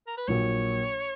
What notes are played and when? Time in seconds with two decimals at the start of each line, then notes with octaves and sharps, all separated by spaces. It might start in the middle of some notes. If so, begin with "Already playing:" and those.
0.07 A#4
0.18 B4
0.28 A#1 A#2 F#3 A#3 C#5